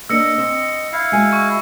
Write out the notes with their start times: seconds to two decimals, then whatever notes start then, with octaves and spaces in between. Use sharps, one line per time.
0.09 A#3 D4 D#5 E6 C#7
0.38 C4
0.93 E4 F5
1.12 G#3 F#4 G#5
1.33 C#6